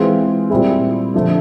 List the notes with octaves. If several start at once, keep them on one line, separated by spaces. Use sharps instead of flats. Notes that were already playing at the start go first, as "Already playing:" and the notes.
Already playing: E3 G#3 C4 F4 G#4
A#2 G3 C4 E4 G#4
D3 F3 A3